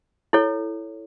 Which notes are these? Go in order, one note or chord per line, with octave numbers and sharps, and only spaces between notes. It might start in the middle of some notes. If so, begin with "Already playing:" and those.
E4 A4 C#5